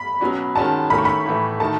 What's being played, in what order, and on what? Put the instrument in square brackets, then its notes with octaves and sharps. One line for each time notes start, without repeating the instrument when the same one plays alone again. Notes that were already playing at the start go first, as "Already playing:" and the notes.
Already playing: [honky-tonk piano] B5
[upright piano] B2 F#3 C#4 F#4
[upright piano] D#3 G#3 C#4 F#4 [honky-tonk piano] A5
[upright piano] D#3 A3 C#4 E4 [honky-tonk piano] B5
[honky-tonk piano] C#6
B5
[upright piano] A2 E3 A3
[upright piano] D#3 A3 D#4 F#4 [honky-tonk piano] A5